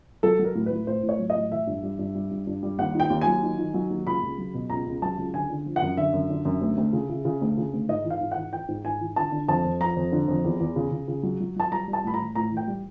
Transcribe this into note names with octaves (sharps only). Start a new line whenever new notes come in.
F#3 A4
F#3
A#4
A2
B4
A2
A2 C5
A2
C#5
F#3
D#5
A2
E3 E5
G2
G3
G2
G3
G2
G2
G3
D#2 F#5
D#3
G5
D#2
F#3 G#5
D#3
D#3
F#3
D#2
C#2 B5
C#2
F#3
B2
C#2 A#5
C#2
F#3 A5
C#2
D3 G#5
D3
F3
F#5
F#2
D3 E5
F#2
D3
F#2
D2
D2
C#3
C#3
C#3
D2
C#3
D2
G#2 D#5
E3
F5
G#2
F#5
E3
E3 G5
G#2
G#2 G#5
E3
D3 A5
D3
F2 A5
F2
F3 A#5
F2
D3
F2
E2
E2
C#3
C#3
C#3
F#3
F#3
F#3 A5
G3 A#5
G3
A5
A2 B5
A#5
E3
A2 A#5
E3
G5
G3